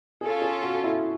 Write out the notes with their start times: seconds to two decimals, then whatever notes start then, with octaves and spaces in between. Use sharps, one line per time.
0.21 C#4 F4 G#4 A4
0.42 G#4
0.62 F#4
0.84 E4